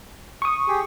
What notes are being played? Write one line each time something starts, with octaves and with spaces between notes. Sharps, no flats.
C#6 D#6
G4 G#4